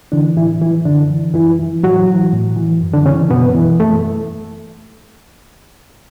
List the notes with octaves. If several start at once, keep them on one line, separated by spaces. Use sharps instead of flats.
D3 E3 D4
A2 E3 E4
E3 E4
F#2 D3 D4
E3
F#2 E3 E4
E3
A2 F#3 F#4
E3
A2
E3
F#2
D3 D4
C#3 E3 C#4
F#2 B2 B3
E3
F#2 A3